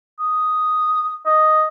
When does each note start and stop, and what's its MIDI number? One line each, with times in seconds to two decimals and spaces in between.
0.20 1.18 87
1.26 1.67 75